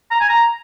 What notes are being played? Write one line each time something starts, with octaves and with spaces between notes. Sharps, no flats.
A#5
G#5
A#5